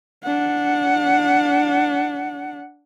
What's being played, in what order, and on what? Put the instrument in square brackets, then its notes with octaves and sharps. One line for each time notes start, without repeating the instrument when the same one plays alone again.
[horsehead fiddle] D4 F#5